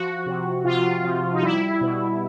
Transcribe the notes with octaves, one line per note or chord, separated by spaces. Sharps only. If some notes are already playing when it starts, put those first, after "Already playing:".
Already playing: F3 F#4
C3
C3 F4
F3
D#4
G3 E4
B2